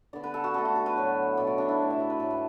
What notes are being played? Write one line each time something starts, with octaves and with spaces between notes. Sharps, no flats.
D3 B3 D5
B4
A4
F#4
D3 A3 A4
F#4
A4
B4
A2 F#3 B3
B2 B3 D5
F#4
D4
E4
A2 E3 B3
E5
D5
B4
A2 A3 A4
B4